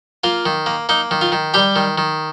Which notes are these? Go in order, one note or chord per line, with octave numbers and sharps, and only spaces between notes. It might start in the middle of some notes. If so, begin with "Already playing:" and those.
A#3 F4
D#3
A#3
A#3 D#4
D#3
F4
D#3
G3 G4
D#3
D#3